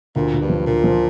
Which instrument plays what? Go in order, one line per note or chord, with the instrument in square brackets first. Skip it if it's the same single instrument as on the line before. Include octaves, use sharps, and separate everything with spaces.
[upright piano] D2 [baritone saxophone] A#2
[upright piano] D2
[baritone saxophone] G2
[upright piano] F3
[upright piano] D2 [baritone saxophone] A#2
[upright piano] F3